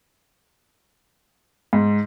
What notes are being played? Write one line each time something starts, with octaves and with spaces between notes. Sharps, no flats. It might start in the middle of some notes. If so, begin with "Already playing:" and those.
G#2